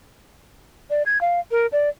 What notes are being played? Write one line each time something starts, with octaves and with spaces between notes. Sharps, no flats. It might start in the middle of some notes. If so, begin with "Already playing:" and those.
D5
G#6
F5
A#4
D5